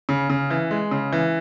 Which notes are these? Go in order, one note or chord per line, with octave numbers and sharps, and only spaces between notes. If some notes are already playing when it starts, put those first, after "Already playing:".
C#3
C#3
E3
G#3
C#3
E3